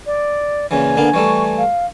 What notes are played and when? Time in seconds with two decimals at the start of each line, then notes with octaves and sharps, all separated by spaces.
0.06 D5
0.71 A#2 C#3 E3 G#5
0.97 D3 A#3 B3 A#4
1.14 E3 G3 A3 C#6
1.58 F5